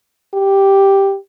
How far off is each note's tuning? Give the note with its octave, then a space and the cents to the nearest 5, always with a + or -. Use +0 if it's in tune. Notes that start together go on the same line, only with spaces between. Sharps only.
G4 +0